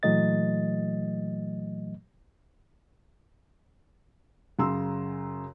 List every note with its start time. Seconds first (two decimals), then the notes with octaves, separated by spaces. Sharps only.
0.03 A#2 E3 F#3 A3 D#5 A6
4.59 F#2 C#3 A#5 C6 E6